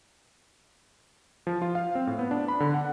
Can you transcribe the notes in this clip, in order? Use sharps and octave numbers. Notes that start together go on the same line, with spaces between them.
F3
F4
F5
C4
A2
B3
D4
B5
D3
F#5